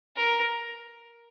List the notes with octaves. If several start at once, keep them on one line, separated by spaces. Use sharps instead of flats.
A#4